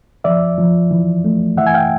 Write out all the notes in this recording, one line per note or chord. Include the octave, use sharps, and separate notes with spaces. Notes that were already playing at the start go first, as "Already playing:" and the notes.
F3 D5 E5
F3
E3
A3
E3 E5 F#5
G#5
F5 G5